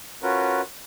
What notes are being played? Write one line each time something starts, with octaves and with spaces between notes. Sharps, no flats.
C#4 F4 F#4 A#4 B4